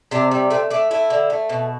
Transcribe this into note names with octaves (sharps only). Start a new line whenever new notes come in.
C3 D4
G3
A3 C4
A3 D4
A3 E4
D3
A3
B2